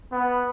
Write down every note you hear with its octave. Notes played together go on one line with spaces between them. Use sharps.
B3